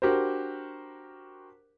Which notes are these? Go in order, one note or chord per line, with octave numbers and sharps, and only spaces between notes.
D4 F#4 G4 A#4 C5